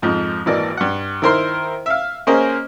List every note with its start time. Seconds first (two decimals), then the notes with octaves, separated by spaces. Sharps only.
0.02 F2 G#2 F3
0.46 G#1 E3 A#3 D5 D#5
0.77 G2 F#5
1.22 D#3 E4 A#4 C5 C6 E6
1.86 E5 F5
2.27 A#3 C#4 G#4 A#4 C5 D#5